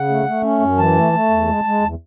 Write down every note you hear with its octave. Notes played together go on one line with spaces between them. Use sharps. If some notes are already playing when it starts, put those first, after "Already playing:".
Already playing: C#3 F#5
A3
A3
C#4
F#2
E3 A5
A3
A3
E2
G#3
G#3
E2